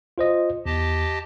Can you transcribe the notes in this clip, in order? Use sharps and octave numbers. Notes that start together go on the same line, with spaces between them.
F4 C5 D#5
E2 G4 D#5 A5